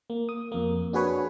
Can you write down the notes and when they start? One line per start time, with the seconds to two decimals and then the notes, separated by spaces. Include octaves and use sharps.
0.10 A#3
0.29 D#6
0.52 F2 A#3
0.93 D4 F#4 G#4 B4 C#5